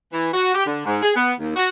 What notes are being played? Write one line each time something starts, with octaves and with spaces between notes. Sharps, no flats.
E3
F#4
G4
D3
G#2
G#4
B3
D#2
F#4